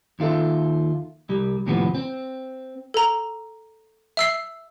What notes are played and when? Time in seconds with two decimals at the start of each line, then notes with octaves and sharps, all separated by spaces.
0.19 D#2 D#3 F4 A4 E5
1.29 C2 G3
1.66 D#2 A2 C3 E3 F3 B3
1.95 C4
2.94 A4 A#5
4.17 E5 E6 C7